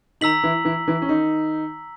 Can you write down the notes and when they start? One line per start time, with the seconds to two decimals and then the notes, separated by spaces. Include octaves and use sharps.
0.21 D#3 D#4 A#5 E6 B6 F#7
0.43 E3 E4
0.65 E3 E4
0.88 E3 E4
1.02 C#4
1.09 D#3 D#4